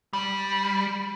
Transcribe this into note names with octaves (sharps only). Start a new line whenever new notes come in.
G3